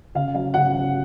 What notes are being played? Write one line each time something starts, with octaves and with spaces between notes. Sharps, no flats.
C#3 F5
F#3 F5
C#3 F#5
F#3